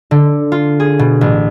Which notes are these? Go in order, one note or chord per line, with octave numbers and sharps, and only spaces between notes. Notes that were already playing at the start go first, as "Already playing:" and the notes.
D3
F4
G#4
B2
A1